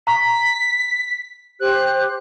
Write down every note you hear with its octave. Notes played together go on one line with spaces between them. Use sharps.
A#5 C#6 B6
G4 C5 F#6